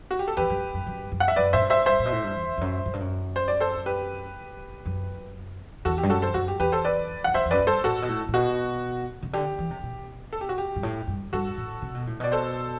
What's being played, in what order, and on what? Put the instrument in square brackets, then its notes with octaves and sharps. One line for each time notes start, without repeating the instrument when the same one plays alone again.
[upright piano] F#4
G4
A4
[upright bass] E2 [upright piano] G4 B4
[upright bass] F#2
F#2
F#2
F#2
[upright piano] F#5
E5
[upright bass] F#2 [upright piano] B4 D5
[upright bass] A2 [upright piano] C5 E5
[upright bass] G2
[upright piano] C5 E5
[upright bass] G2 [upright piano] C5 E5
[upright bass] A2
B2
A2
G2
E2
E2
F#2
F#2
G2
F#2
[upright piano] C5
D5
A4 C5
G4 B4
[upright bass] F#2
[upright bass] E2 [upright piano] F#4 A4
[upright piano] G4
[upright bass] G2
[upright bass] F#2 [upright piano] F#4 A4
[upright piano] A4 C5
[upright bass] F#2 [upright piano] F#4
[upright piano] G4
[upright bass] E2 [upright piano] G4 B4
[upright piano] A4 C5
B4 D5
[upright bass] E2 [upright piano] F#5
[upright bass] F#2 [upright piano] C5 E5
[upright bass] E2
[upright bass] F#2 [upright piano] B4 D5
[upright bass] G2
[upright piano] A4 C5
[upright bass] A2 [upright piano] F#4 A4
[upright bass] B2
A2
A2
[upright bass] B2 [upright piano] F#4
[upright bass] C3
[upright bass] D3 [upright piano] G4
[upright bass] E3
C3
B2
[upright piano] A4
G4
F#4
G4
[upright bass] G2
A2
G2
[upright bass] G2 [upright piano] F#4 A4
[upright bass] A2
C3
B2
A2
[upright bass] B2 [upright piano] D5
[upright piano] A4 C5